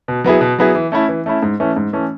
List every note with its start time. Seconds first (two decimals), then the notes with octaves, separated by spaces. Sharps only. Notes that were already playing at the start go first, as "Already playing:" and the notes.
0.08 B2
0.24 F#3 B3 E4 G#4
0.41 B2
0.58 F#3 B3 E4 G#4
0.75 E3
0.92 A3 C#4 E4
1.09 E3
1.26 A3 C#4 E4
1.43 G#2
1.60 E3 A3 C#4
1.76 G#2
1.93 E3 A3 C#4